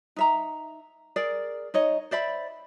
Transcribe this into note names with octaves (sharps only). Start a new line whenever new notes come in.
D#4 E5 A#5
G#4 A#4 D5
D#4 C#5 D#5
C5 D5 E5 B5